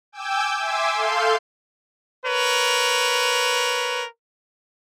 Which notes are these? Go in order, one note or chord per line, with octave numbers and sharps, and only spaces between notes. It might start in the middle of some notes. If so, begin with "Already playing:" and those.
G5 G#5 D6 E6 G6
E5 G#5 C6 D6 E6
A4 F5 C6 G6
A#4 B4 C#5